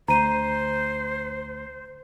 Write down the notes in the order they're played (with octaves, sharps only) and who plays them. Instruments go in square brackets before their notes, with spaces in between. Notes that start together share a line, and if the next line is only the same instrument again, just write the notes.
[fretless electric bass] D2 [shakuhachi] C5 [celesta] A#5 D#7